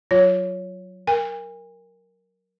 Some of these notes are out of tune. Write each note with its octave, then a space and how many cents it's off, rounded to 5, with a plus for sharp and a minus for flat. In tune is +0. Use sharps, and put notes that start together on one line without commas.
F#3 +0 F4 +0 C#5 +0
A#4 +0 G#5 -40